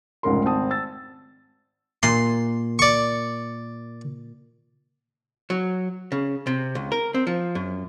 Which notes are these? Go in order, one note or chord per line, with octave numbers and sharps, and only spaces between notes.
F1 C#2 G#2 C#3 A#4 C6
G#1 C4 A5 D#6
E6 A6
A#2 C6
D5 C#6
F#3
C#3
C3
C#2
A#4
C4
F3
F#2